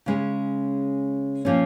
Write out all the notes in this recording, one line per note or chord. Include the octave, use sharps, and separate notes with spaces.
C#3 G#3 C#4
A#2 F3 C#4